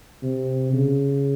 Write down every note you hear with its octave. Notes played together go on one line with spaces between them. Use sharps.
C3
C#3